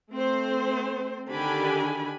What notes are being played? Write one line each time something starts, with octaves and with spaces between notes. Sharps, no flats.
A3 C4 C5
D3 D#3 D4 G4 G#5 B5